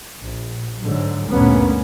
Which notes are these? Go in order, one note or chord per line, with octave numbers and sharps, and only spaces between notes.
A#1
G#2 D3 F#3
D2 G2 A#2 A#3 B3 C#4